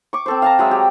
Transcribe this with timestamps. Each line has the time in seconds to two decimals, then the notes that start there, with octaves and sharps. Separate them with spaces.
0.13 C#6 D6
0.26 C4 A4 C5
0.42 F5 A5 A#5
0.59 F#3 G#3 E5
0.71 G4